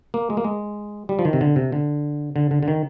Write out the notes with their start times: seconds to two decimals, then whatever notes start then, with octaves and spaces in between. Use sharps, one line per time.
0.14 A#3
0.30 G#3
0.37 A#3
0.44 G#3
1.09 G3
1.19 F3
1.25 D#3
1.33 C3
1.41 D3
1.56 C3
1.72 D3
2.36 D3
2.51 D3
2.63 D3
2.68 D#3